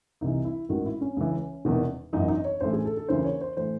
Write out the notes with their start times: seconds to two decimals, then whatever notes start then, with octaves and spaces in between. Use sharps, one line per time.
0.21 C2 C3 E3 D#4
0.45 E4
0.69 A1 G#2 D#3 F#4
0.85 E4
1.01 C#4
1.17 C#2 C#3 E3
1.65 E1 E2 C3 D#3
2.13 G#1 F#2 E3 D#4
2.28 D#4
2.44 C#5
2.61 A1 A2 E3 C5
2.73 G#4
2.85 A4
2.97 A4
3.08 D#2 C#3 E3 C5
3.24 C#5
3.41 C5
3.57 A2 E3 C5